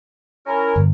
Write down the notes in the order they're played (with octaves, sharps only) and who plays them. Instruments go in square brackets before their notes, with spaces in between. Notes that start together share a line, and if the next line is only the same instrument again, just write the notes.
[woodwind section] C#4 E4 A#4
[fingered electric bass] G1